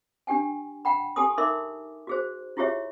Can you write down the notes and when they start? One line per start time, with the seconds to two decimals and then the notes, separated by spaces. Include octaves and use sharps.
0.27 D4 G4 G5 G#5
0.85 F#5 G5 B5
1.16 G4 A4 G#5 C6 D#6
1.37 D#4 A4 A#4 E5 C6 D6
2.07 F#4 G#4 C5
2.57 E4 F4 G4 G#4 C#5 E5